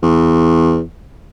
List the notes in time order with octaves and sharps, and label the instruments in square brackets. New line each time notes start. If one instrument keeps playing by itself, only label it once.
[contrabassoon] E2